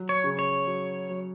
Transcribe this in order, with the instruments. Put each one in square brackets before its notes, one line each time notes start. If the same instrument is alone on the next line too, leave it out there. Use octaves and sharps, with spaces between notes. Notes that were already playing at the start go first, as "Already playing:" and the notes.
Already playing: [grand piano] F#3
[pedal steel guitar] C#5
[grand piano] C#3
[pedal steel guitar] C#5
[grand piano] F#3
F#3